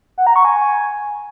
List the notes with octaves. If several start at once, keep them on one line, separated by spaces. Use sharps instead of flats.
F#5
A#5
C#6
G#5